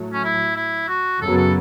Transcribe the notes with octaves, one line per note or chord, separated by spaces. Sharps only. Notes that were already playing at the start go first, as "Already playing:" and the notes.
Already playing: A2 F#3 A3
C#4
E4
E4
F#4
F#2 C#3 F#3 B3 A4
A4